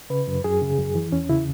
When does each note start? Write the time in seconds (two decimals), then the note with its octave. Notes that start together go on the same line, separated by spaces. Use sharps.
0.10 C#3 B4
0.27 F#2
0.44 F#2 G#4
0.61 C#3
0.78 F#2
0.95 E3
1.12 E2 C#4
1.29 C#3 E4